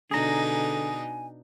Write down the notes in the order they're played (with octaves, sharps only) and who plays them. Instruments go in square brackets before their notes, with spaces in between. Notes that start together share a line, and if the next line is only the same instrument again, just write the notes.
[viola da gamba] B2 D4 D#4 [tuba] D3 [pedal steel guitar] G#4 A#5 [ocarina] G#5